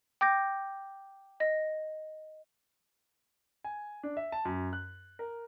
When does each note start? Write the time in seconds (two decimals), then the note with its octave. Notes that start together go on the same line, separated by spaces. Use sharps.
0.21 G5 D6 G6 A#6
1.40 D#5 A#6
3.64 G#5
4.03 D4
4.17 E5
4.32 A5
4.45 F#2
4.73 F#6
5.19 A#4